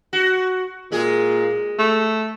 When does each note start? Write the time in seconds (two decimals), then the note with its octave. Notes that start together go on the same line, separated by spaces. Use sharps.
0.13 F#4
0.92 A#2 G#3 G#4
1.79 A3